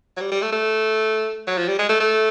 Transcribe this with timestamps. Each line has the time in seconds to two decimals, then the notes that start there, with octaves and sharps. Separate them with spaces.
0.17 F#3
0.21 G3
0.31 G3
0.42 A3
0.52 A3
1.47 F#3
1.58 F3
1.68 G3
1.79 G#3
1.89 A3
2.00 A3